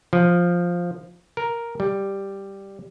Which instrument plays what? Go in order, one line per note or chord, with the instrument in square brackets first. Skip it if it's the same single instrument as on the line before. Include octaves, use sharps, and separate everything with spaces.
[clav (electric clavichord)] F3
A#4
G3